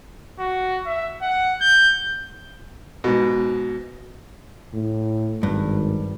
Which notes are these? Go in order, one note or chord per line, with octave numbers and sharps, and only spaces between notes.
F#4
E5
F#5
G6
G#2 B2
A2
G#1 G2